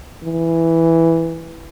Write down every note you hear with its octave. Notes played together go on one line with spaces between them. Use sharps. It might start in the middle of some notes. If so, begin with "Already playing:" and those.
E3